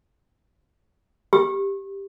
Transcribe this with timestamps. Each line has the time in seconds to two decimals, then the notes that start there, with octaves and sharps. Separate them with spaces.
1.33 G4